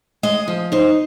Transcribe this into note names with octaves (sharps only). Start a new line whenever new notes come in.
G#3 D#5
F3
D#4 C5